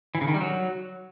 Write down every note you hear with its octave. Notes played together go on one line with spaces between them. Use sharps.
E3
C#3
D#3
G3
F#3